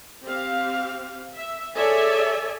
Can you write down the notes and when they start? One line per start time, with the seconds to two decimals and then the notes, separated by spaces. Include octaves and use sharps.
0.24 C4 G4 F5
1.33 E5
1.76 G#4 A4 C#5 D5 E5 G#5